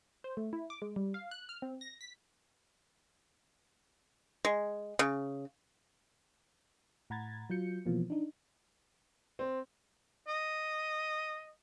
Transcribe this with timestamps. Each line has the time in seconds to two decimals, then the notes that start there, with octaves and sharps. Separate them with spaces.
0.24 C5
0.37 A3
0.53 E4
0.70 D6
0.82 G#3
0.96 G3
1.14 F5
1.31 F#6
1.49 F6
1.62 C4
1.81 A#6
2.01 B6
4.45 G#3
4.99 C#3
7.10 A2 F#5 A#5 B5 G#6 A6
7.50 F#3 F4 G6 C#7
7.86 B2 E3 F3 A#3
8.10 D4 D#4
9.39 C4
10.28 D#5